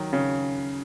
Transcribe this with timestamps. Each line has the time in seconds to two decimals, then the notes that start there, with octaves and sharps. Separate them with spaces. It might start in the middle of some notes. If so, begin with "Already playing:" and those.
Already playing: D#3 F#3
0.13 C#3